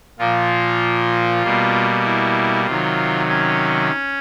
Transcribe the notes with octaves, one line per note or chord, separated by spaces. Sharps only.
A#2 F3 A#3 F4
B2 G3 A#3
E4
C3 D#3 F#3 F4
C#4